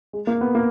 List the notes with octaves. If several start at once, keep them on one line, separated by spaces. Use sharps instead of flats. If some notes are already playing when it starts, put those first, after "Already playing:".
G#3
A#3
B3
A#3